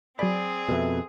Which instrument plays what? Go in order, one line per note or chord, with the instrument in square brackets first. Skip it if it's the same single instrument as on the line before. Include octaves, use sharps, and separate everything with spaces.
[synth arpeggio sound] F#3 B5 [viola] C4 G#4 [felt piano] D5
[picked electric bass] F2 B2 [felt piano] A4 B4 E5